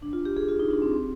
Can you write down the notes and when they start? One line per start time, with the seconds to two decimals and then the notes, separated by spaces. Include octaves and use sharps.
0.02 D4
0.13 F4
0.25 G4
0.37 G#4
0.48 F4
0.60 D#4
0.71 D4
0.82 C4
0.93 C4